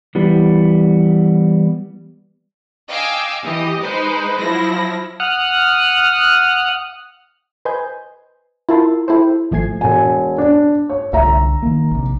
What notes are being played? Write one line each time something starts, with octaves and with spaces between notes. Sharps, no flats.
E3 G3 B3
D#5 F5 G5 G#5 D6 E6
E3 G4 D#5
G#3 D#4 B4 C5
F3 F#3 E4 A#6
F#5 D#6 F6 F#6
B4 C5 D#5 G#5 G6
E4 F4 A#4 E5 A5 C6
E4 G4 A4 C5
G#1 F3 A3 G#5 G#6 C7
E1 G#5
D4
C#5
C2 D3 E5 A#5
D#3 A#3
A#1 C3